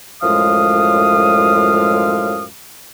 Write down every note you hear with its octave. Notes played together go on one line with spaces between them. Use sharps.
F#2 A2 F3 G#3 F5 D#6